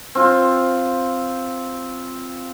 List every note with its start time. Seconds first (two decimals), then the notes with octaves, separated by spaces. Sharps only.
0.15 C4 F4